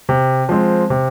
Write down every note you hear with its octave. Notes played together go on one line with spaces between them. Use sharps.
C3
F3 G#3 C4
C3